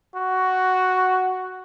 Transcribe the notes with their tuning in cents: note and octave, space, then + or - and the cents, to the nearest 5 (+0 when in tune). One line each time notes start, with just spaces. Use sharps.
F#4 +5